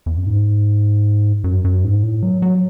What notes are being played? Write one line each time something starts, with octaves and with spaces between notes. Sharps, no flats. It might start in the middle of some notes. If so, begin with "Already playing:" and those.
E2
F#2
G#2
F#2
F#2
G#2
A2
F#3
F#3